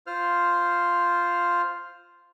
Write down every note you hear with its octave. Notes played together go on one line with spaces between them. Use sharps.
F4 C5 F6